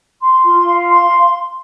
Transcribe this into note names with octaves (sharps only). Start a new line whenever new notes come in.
C6
F4
F5
C6